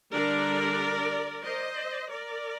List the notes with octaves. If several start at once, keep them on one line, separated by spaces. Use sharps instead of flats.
D3 G3 D4 A#4 D5
C5 D#5
A#4 D5